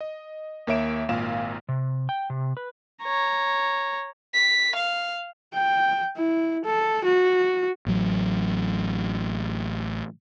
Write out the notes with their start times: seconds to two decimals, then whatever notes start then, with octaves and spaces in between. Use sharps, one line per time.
0.01 D#5
0.67 D#2 A#3 C#5 E5 D7 E7
1.09 G#1 A#2 A#3 F5 E7
1.69 C3
2.09 G5
2.30 C3
2.57 B4
3.03 C#5 A#5
4.35 B6
4.77 F5
5.53 G5
6.17 E4
6.65 A4
7.05 F#4
7.86 A1 F#3